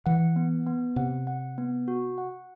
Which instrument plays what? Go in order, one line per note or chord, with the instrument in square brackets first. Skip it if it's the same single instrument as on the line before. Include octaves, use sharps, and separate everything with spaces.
[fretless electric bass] E3 [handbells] F#5
[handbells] B3
B3
[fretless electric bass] C3 [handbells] F#5
[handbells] F#5
B3
F#4
F#5